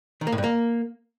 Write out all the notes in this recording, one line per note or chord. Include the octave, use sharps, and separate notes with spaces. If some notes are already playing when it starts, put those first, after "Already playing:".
D#3
A#3
A2
G2
A#3